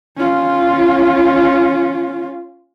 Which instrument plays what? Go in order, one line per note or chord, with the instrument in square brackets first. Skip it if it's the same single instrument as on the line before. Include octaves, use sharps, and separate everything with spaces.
[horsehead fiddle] C#4 F4